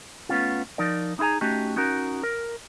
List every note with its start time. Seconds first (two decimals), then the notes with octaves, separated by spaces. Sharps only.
0.29 A3 B3 C#4 F4
0.78 F3 D#4 A#4 D5
1.19 D#4 E4 G#4 G#5 A#5
1.41 A3 C#4 D#4 F#4 G4
1.76 C#4 D#4 F#4 A#4
2.23 A#4